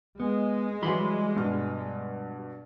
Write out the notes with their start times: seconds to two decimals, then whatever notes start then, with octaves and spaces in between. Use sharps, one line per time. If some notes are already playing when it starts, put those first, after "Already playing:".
0.20 G#3 B3
0.82 E3 F#3 G3 B5 C6
1.36 G2 B2 F6